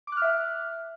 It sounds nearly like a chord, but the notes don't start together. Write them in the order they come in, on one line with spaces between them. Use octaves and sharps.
D6 F#6 F6 E5